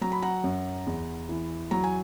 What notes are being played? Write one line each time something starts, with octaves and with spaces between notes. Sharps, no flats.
F#3 A#5
B5
F#5 A#5
F#2
E2
E3
F#3 A#5
G#5